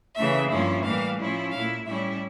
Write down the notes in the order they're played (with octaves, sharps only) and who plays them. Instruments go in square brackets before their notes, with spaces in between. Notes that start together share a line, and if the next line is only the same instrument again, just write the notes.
[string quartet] C#3 E3 A3 E5
G2 F3 A#3 C#4 E4
A2 E3 G3 A#3 F5
A2 F3 C#4 E4
A#2 A3 E4 F5
A2 G3 C#4 E4 E5